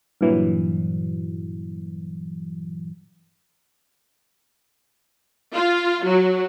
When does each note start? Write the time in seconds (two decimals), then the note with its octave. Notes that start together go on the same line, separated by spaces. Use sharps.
0.21 G2 A#2 E3 F#3
5.55 F4
6.06 F#3